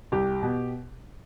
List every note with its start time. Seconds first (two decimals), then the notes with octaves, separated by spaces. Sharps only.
0.12 C2 G4
0.43 B2